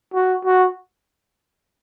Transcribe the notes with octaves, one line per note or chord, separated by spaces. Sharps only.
F#4
F#4